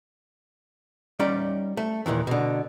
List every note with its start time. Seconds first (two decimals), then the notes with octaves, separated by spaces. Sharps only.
1.19 G3 C#4 D#4 D5
1.77 A3
2.06 D#2 A#2 D#3 E3
2.27 B2 D3